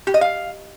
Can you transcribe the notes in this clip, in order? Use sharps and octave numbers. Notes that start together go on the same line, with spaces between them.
G4
D#5
F5